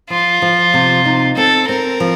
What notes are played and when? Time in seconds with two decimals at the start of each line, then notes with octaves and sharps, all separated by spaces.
0.10 F3 F4
0.42 F3
0.74 C3
1.05 D#4
1.37 C4 A4
1.69 C4 A#4
2.00 F3